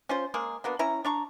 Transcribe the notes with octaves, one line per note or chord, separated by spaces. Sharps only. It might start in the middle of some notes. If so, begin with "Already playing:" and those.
C#4 F4 C5
G#3 A#3 G#4
F#3 A#3 B3 D4
C#4 E4 A#5
D4 A#5 C#6